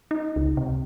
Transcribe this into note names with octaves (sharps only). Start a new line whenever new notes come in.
D#4
C#2
C3